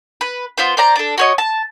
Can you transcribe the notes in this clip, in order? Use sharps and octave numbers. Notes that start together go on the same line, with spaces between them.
B4
B3 F4 C5
C5 D5 A#5
D4 A4
F#4 C#5 D#5
A5